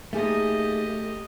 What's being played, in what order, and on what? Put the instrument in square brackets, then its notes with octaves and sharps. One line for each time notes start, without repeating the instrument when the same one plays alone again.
[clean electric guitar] A3 [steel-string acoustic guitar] A#3 D#4 G#4 [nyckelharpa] G4 D#5